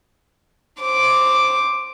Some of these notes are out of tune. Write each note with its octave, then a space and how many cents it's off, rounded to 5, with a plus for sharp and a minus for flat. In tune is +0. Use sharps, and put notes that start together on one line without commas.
C5 +0 D6 +0